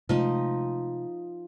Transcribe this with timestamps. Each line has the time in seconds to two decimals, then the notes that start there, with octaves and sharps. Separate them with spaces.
0.09 C3 F3 G#3 A3 D#4 D#5